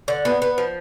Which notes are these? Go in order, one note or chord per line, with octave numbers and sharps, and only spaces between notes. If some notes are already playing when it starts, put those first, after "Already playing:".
D3
B3
B3
F3